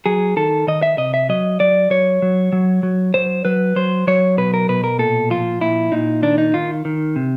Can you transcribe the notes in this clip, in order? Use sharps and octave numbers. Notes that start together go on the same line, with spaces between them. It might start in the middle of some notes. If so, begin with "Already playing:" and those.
F#3 G#4
D#3 A4
D#3 D#5
E5
C3 D#5
E5
F#3 D#5
F#3 D5
F#3 C#5
F#3
F#3
F#3
F#3 C5
F#3 B4
F#3 C5
F#3 C#5
B2 B4
A#4
B2 B4
A#4
A#2 A4
F3 F4
A#2 E4
A#2 D#4
D#3 D4
D#4
D#3 F4
D#3
C3